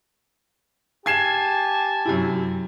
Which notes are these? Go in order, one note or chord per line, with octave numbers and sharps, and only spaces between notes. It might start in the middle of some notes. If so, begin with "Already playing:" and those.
G4 G#5 A5 G#6 C7 E7
F#2 C3 E4